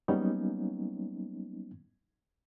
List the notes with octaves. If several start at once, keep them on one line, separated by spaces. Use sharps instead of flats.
F#3 G3 A#3 B3 C#4 D#4